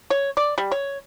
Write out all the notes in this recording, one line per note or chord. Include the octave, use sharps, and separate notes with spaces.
C#5
D5
G3
C#5